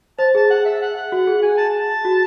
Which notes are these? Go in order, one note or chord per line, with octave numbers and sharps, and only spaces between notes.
C5 A5
G#4 A5
F#5
E5
F#5
F#5
F#4
G#4
G#4 G#5
A5
A5
F#4